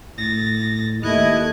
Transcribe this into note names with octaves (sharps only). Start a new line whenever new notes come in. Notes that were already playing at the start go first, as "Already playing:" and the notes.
A2 A6 A#6
D#2 A3 E4 D#5 F#6 G#6